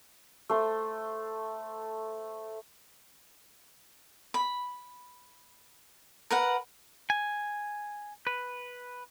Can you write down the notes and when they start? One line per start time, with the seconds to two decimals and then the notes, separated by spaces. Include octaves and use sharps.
0.49 A3 C5
4.34 B5
6.31 A#4 B4 F#5
7.10 G#5
8.27 B4